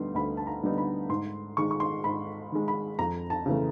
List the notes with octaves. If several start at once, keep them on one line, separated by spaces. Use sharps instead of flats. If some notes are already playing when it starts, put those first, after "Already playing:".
Already playing: D2 D3 G3 B3 D#4 C6
D2 B5
A5
A#5
D3 G3 B3 D#4
B5
G#2 C6
D#3 G#3 C#6
C#6
C6
G#2 B5
D#3 G#3
B5
F2 A#5
A5
C#3 E3 A3